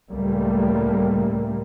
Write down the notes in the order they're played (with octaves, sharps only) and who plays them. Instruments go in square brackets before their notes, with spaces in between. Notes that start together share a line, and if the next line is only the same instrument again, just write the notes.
[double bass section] C#2 A2 G3 A3 A#3